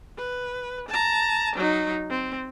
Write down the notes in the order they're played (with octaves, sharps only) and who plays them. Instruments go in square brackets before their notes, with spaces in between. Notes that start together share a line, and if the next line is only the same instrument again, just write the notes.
[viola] B4
A5 A#5
F#3 D#4
C4